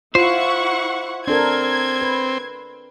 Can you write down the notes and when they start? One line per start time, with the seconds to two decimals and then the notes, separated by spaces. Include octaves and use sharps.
0.15 E4 F4 C5 F#5 C#6
1.28 C4 D4 A4 A#4 G#6
2.01 B4